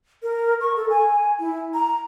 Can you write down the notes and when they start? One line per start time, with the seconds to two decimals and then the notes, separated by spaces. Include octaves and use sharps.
0.23 A#4
0.61 C#6
0.76 A4
0.90 G#5
1.39 E4
1.74 A#5